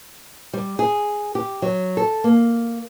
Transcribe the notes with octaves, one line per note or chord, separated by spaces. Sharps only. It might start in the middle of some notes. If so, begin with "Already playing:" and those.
G3
G#4
G4
F#3
A4
A#3